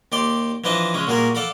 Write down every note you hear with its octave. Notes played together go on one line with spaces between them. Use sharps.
D#2 G4 D5 C6
E3 F3 D4 B4 D#5 A5
C#3 G#3 C#4
A#2 G3 F#4 G#4 A#4
A4 D5 F5 F#5 B5